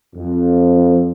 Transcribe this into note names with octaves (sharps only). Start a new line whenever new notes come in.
F2